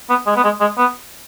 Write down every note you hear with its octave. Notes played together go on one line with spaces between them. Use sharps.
B3
G#3
B3
G#3
G#3
B3